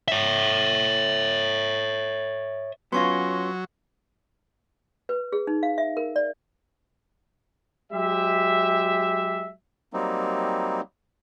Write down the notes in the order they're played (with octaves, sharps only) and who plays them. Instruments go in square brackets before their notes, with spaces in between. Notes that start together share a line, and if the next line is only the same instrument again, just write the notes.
[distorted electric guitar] C#5 E5
[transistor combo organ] F#3 [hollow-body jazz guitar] B3 C#4 F4 [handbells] C6 C#6 A#6
[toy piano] B4
G#4
D#4
F5
E5
A#4
D5
[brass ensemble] F#3 G#3 G4 E5
[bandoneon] F#3 G3 A#3 C4 D#4